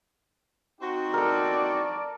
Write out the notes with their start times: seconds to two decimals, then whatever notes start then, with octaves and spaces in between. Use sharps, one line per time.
0.81 C4 D#4 F#4
1.14 A4 A#4 D5